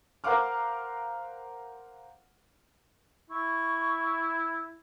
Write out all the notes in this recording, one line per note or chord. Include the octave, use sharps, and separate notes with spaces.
A#4 C5 F5 F#5 D6 F6
E4 C#6